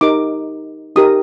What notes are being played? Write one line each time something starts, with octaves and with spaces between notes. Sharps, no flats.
D#4 G4 A#4 D6
D#4 G4 A#4 D#6